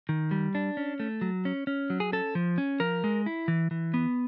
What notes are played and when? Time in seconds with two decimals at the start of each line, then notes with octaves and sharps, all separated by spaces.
0.09 D#3
0.31 G3
0.55 D4
0.77 C#4
1.00 A3
1.21 F#3
1.45 C#4
1.67 C#4
1.90 F#3
2.00 G#4
2.12 C#4 A4
2.35 F3
2.58 C#4
2.80 F3 A#4
3.04 G#3
3.26 E4
3.48 E3
3.71 E3
3.94 B3